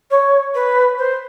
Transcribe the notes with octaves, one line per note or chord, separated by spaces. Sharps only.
C#5
B4
C5